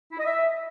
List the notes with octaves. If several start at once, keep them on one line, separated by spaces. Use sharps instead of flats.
E4
D#5
E5